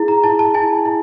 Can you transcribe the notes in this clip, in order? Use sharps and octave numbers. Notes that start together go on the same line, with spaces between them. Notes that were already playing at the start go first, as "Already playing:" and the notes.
Already playing: E4 G#4
A#5
E4 A5
A5
E4 G#5
E4